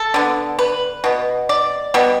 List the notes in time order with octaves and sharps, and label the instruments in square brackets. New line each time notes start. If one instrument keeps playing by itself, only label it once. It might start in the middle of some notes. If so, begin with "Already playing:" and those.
Already playing: [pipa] A4
D3 B3
B4
B2 B3
D5
B2 G3 B3